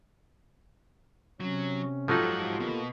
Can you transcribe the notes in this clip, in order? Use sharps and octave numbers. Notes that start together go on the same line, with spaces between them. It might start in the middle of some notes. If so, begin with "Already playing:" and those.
C3 F#3 C#4
G#2 F3 F#3 D#4 F4 G4 A4 F#5
B2 A#3